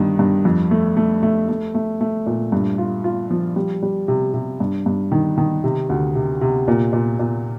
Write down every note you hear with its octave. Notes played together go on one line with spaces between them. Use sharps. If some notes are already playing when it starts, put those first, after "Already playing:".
Already playing: G2 D#3
G2
F2
A3
A3
A3
A3
A3
A3
A#2
G2
F4
F4
F3
G3
G3
C3
C3
G2
G2
D#3
D#3
C3
D2
C3
C3
A#2
A#2
A#2